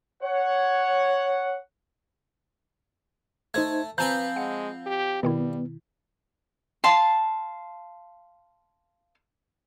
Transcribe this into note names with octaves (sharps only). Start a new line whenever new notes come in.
C#5 F#5
A3 D#4 C5 G#6
F3 C4 B4 G#5 A#5 B5 G6
G#3 F#5
G4
B2 D#3 G3 B3 E4
F5 A5 C6